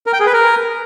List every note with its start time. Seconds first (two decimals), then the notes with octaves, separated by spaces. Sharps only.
0.06 A#4
0.13 G5
0.20 G#4
0.27 B4
0.33 A#4